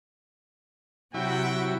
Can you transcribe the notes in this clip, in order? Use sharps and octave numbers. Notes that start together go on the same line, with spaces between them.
C3 F#3 E4 F#4 G5